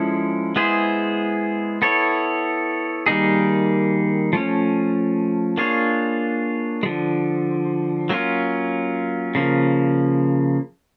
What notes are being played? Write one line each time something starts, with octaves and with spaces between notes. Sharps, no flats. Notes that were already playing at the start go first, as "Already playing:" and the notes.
Already playing: F3 G#3 C#4 E4 A4
G#3 B3 E4 G#4 C5
B3 E4 A4 C#5
D#3 G3 A#3 D#4 G#4
F3 A3 C#4
A#3 D4 F4 G#4 C#5
D3 F3 G#3
F#3 A#3 C#4 F4
C#3 F3 A#3